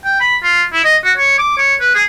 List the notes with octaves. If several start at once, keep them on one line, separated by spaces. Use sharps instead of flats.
G5
B5
F4
E4
D#5
F#4
C#5
D6
C#5
B4
G#4